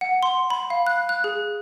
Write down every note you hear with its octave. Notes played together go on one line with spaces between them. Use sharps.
F#5
C6
B5
F5
F#6
F#6
G#4